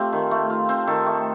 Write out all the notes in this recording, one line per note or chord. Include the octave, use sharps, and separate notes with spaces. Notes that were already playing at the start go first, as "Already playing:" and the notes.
Already playing: A3 C4 F4 G4
D#3
A3
F4
C4
D#3 A4
A3